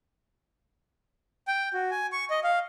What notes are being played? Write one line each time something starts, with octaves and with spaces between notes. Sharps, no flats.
G5
F#4
G#5
C#6
D#5
F5